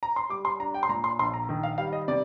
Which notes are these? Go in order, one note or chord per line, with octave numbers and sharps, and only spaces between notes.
A#5
C6
G3 D6
C6
D4 A#5
G5
C6
A#2 A#5
C6
A#1 C6
A#5
D#3
F5
G3 F5
D#5
C3 D5